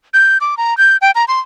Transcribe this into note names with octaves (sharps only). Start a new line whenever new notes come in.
G6
D6
A#5
G6
G5
A#5
C6